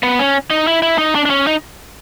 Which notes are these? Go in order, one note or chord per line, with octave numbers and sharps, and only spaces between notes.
B3
C#4
D#4
E4
E4
D#4
D4
D4
C#4
D#4